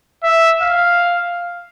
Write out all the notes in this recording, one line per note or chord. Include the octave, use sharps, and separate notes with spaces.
E5
F5